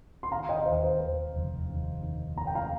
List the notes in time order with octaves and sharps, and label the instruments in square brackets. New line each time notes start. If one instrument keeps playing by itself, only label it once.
[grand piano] C6
D#3 F5 A#5
D#5 G5
D#5
D#2 C5 F5
C5
D#2 C5
F1
D#2
D#3
A#3 A#5
G5
F5 A#5